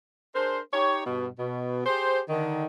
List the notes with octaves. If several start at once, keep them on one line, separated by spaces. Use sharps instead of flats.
D4 G#4 A#4 C5
D#4 G4 C#5
G2 B2
B2
G4 G#4 C5
D3 D#3